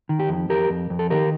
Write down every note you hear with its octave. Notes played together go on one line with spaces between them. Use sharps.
D#3
G4
F2
F2 G4 A#4
F2
F2
A4
D#3 G4 A#4